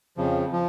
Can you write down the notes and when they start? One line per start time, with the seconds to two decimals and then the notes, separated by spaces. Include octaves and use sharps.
0.17 F2 C#3 F3
0.52 F3